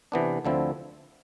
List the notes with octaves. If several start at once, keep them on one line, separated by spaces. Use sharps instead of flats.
C3 E3 B3 D4
D2 D3 F3 C4 E4